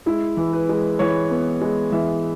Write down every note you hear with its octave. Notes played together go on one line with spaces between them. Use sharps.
G#3 E4
E3
B4
G#3
E3 C#5
B3
G#3
E3 E5